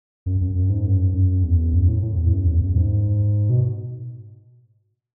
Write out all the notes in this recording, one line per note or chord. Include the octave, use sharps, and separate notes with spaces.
F#2
F#2
F#2
G#2
F#2
F#2
E2
F#2
A2
A2
E2
F#2
E2
F#2
G#2
B2